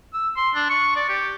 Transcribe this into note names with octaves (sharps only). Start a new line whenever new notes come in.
E6
C6
D4
C#6
D5
G4